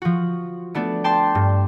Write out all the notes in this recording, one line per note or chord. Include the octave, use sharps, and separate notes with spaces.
F3 F#4
A3 B3 D4
G5 A5 C6 D6
G2